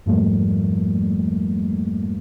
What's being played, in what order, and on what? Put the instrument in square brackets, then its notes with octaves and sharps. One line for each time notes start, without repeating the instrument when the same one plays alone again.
[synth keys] F2 G#2 F3 G3 A3 A#3